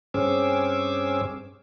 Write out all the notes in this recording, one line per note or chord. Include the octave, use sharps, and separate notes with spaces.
G2 C4 C#4 G#4 D6 E6